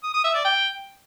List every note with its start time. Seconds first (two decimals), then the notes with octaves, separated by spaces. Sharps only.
0.04 D#6
0.14 D#6
0.24 E5
0.34 D5
0.45 G5